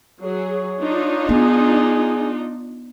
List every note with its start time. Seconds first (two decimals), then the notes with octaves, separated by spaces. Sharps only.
0.22 F#3 G#4 C#5
0.79 D4 D#4 F4
1.29 B3 G#4